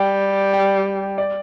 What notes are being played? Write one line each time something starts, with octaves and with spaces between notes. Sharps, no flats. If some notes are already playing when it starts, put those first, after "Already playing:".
Already playing: G3 G5
G5
D5